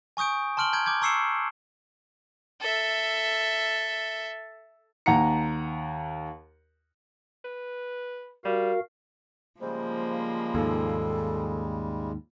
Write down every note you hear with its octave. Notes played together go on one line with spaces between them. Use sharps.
G#5 C#6 D#6 G6 D7
A5 C6 F6 D7 F#7 G7
A#5 G6 G#6 D7
D6 G6 G#6
A#5 C#6 E6 C7 C#7 E7
A4 E5
D#2 F#5 A#5 C#7
B4
G3 F#4 A#4 F5
C#3 F3 G3 G#3 A#3 C5
D#2 G#2 A4